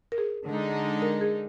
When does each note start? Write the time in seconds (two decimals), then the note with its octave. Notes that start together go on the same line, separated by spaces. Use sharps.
0.12 A#4
0.18 G#4
0.47 D3 G#3 D#4
1.02 A#4
1.21 G#4